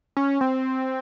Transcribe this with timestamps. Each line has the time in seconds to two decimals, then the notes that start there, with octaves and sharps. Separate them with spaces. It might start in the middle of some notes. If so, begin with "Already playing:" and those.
0.17 C#4
0.41 C4